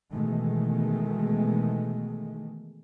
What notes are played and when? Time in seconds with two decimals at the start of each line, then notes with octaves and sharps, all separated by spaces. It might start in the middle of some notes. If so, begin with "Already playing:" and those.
0.12 B2 D#3 E3 G#3 A3